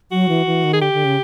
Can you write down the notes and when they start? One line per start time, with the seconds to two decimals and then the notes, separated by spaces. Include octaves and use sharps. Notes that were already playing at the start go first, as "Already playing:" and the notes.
0.11 F#3 F#4
0.29 E3
0.46 E3
0.64 D#3
0.73 G#4
0.81 D3 G4
0.93 D3
1.05 C#3